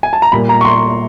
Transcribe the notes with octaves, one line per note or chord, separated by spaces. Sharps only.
G#5
A5
A#5
A#2 G3 A#3 B5
A#5
C#6
C6